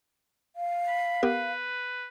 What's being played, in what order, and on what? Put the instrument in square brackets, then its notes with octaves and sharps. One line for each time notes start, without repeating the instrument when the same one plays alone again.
[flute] F5
[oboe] B5
[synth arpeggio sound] B3 G4 A#4 [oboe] B4